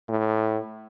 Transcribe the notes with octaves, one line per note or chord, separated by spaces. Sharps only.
A2